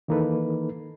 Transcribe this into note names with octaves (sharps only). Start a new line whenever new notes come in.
D#3 E3 A#3 D#4 A4 B4